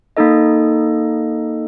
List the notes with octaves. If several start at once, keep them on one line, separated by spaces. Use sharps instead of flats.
A#3 D#4 A4 D#5